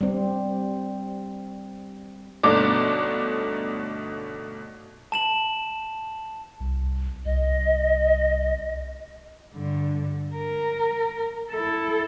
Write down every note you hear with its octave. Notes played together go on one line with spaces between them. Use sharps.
G3 C4
G1 B2 A3 D4 D#4 D6
A5 E7 F#7
C2
C2 D#5
G2 D3
A#4
E4 A4